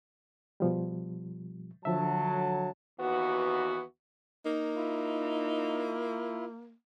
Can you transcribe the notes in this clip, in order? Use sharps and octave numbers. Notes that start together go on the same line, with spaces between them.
B2 F3 G3
D3 F3 F#3 E5 A5
D#2 E3 B3 F#4
A#3 D#4
E4 F4